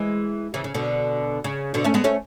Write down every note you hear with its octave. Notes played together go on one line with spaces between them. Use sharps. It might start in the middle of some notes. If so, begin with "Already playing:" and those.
Already playing: E3 G#3
C#3 E3
C#3
B2 D3
C#3
B2 D3
A3 C#4
G#3 B3
A3 C#4